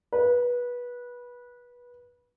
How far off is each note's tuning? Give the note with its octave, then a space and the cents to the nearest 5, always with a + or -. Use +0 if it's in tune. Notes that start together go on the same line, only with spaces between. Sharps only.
B4 -20